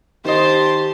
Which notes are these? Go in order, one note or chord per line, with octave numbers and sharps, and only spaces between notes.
D#3 G4 C5 D#5 A5 C6